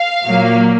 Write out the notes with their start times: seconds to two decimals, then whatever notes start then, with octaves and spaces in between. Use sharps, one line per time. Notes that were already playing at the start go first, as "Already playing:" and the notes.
Already playing: F5
0.25 A#2 F#3 A#3